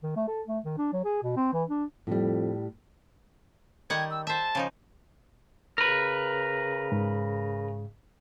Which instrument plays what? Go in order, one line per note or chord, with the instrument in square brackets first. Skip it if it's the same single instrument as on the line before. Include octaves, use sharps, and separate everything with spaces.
[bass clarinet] D#3
A3
A4
A3
D#3
D4
F#3
G#4
B2
C4
E3
D4
[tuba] F2 [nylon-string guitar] A2 G3
[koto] D#3 G3 F#5 [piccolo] G#6
[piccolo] E6
[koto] C5 E5 [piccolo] A5
[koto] C#3 F3 D#4
[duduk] C#3 [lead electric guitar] A#4 B4
[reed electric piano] G#2